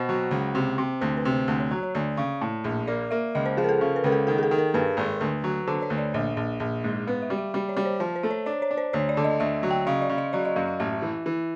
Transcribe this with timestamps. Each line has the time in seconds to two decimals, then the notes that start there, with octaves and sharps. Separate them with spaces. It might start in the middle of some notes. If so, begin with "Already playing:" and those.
Already playing: B2 C5 F#5 G5
0.09 F#3
0.31 C#2
0.55 C3
0.78 C3
1.01 D2 C5
1.17 B4
1.25 C3
1.32 C5
1.48 D2 F#5
1.60 C#5
1.71 F#3 C#5
1.83 C#5
1.95 D2 D5
2.17 C#3
2.41 A2
2.64 A#1
2.87 A#3 D5
3.11 A#3 E5
3.35 C#2 D#5
3.46 C5
3.57 F3 G#4
3.64 A#4
3.69 A4
3.81 C#3
3.96 B4
4.04 C#2 A#4
4.12 A4
4.27 D#3 A4
4.38 G#4
4.43 A4
4.51 D#3
4.59 A#4
4.74 G2 B4
4.97 G#1
5.21 D2
5.44 F#3
5.67 D3 C5
5.82 C#5
5.90 D2
5.98 D5
6.14 A#1 D#5
6.37 A#1
6.60 A#1
6.84 G#2
7.07 B3 F5
7.22 E5
7.30 G3
7.38 E5
7.54 G3 D5
7.69 C#5
7.77 G3
7.85 C5
8.00 F3 C5
8.16 C5
8.23 A3
8.31 C#5
8.46 D4 C#5
8.62 C#5
8.71 D4
8.77 C5
8.93 D2 C#5
9.09 D5
9.17 D3
9.24 D#5
9.40 D2 E5
9.63 F#3
9.71 G5
9.87 C#3 D#5
10.02 D5
10.09 C#3
10.18 D#5
10.33 F#3 D5
10.45 D#5
10.56 F#2 F5
10.68 F5
10.80 A1 E5
11.02 E3
11.26 E3